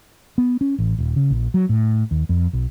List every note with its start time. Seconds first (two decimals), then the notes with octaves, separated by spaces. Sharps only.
0.38 B3
0.61 C#4
0.79 A1
0.98 D#1
1.16 C#3
1.30 A#1
1.54 F#3
1.69 A2
2.11 D#2
2.29 F2
2.53 B1